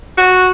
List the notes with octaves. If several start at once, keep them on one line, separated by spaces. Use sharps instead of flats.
F#4